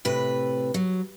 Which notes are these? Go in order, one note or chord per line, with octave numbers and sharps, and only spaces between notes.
A2 C3 B4
F#3